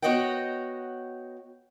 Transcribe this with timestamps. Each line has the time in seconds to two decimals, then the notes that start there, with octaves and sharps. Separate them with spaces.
0.02 B3 F#4 C#5 D#5 F#5 G5